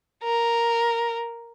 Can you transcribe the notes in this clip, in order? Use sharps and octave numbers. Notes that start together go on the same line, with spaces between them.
A#4